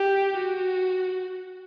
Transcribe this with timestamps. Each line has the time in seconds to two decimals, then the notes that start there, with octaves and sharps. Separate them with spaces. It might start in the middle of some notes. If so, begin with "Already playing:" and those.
Already playing: G4
0.37 F#4